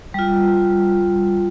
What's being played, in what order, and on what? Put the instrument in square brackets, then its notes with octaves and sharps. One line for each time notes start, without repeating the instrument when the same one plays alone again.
[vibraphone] G3 F4